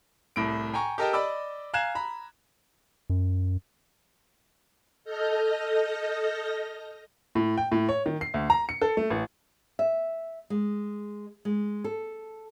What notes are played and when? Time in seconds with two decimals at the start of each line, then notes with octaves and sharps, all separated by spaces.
0.36 C2 A2 D7
0.74 G5 G#5 A#5 C#6
0.98 G4 A4 A#4 D#5 G5 A5
1.13 D5 D#5 B5 D6 E6
1.74 F5 G#5 A#5 F#6 G#6 E7
1.95 A#5 B5
3.10 F#2
5.04 A4 D#5 F6 G6 A#6
7.35 A2
7.57 G5
7.72 A2
7.89 C#5
8.06 D#3
8.21 C7
8.34 D2
8.50 A#5
8.69 C#7
8.82 A4
8.97 A3
9.10 A1
9.79 E5
10.50 G#3
11.45 G#3
11.84 A4